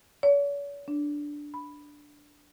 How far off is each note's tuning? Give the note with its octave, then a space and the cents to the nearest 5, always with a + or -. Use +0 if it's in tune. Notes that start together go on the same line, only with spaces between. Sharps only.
C#5 +45
D4 +0
B5 +0